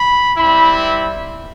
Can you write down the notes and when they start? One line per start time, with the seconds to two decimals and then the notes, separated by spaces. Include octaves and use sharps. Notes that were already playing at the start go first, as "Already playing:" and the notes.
Already playing: B5
0.38 G3 C4 E4 B5